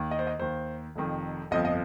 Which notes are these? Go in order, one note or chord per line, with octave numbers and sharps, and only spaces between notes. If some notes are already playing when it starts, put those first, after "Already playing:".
Already playing: D#2 D#3
D#5
C5
D#5
D#2 D#3 C5
F1 F2 D#3
G1 F2 F3 D#5
D#5